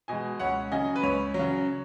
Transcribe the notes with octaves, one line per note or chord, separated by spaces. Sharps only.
B2 G#3 D#5 G#5
C#2 C#5 F#5
C#3 F#3 D#5 G#5
B4
C#2 C#5
F#3
C#3